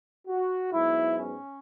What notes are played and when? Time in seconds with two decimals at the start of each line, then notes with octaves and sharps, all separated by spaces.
0.26 F#4
0.71 G#2 F#3 B3 E4
1.16 C#4